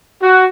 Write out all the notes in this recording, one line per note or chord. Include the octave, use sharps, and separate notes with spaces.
F#4